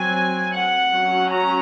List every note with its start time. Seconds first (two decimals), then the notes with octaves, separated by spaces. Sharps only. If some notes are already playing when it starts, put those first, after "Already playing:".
Already playing: F#3 C4 G#5
0.55 F#5
0.93 F#3 C#4
1.32 A#5